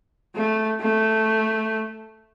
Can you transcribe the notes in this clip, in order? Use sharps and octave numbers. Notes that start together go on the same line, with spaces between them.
A3
A3